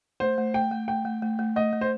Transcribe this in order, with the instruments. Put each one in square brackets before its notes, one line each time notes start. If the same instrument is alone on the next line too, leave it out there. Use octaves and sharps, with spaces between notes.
[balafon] A3 [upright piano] C5
[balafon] A3
[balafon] A3 [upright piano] G5
[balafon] A3
[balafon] A3 [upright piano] G5
[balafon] A3
A3
A3
[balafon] A3 [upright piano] D#5
[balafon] A3
[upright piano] C5